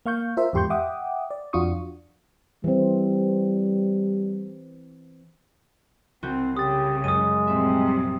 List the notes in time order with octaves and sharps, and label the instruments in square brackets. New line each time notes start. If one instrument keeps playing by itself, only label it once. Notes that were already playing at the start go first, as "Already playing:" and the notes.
[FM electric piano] A#3 F5 C#6 G6
F4 A#4 C5 E5
E2 G#2 G4 C6 C#6 G6
E5 F#5 G5 D6 D#6
D5
F2 D4 F4 F#4 C#6 D#6
[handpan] E3 C4 [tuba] G3
[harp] C2 F#4 G6 [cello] C4
[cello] C#3 [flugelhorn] G4 [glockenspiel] D#6 A6
[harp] F#2 [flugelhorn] G#3 [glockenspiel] D#6 D#7
[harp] A#1 E5 [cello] C3 G3